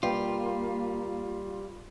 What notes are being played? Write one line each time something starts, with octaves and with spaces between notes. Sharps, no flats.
G3 A#3 F4 B4 G5